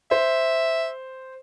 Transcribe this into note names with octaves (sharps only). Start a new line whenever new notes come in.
C5 E5